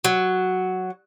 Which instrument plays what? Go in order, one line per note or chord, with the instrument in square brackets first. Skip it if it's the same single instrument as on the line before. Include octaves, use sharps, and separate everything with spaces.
[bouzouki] F#3